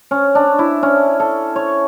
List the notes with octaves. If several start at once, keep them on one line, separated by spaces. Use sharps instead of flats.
C#4
D4
E4
C#4
A4
C#5